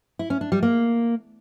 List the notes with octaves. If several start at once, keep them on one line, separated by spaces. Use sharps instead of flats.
E4
C#4
D4
G3
A#3